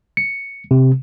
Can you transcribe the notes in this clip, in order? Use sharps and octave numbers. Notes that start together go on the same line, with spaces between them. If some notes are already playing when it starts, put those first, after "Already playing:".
C#7
C3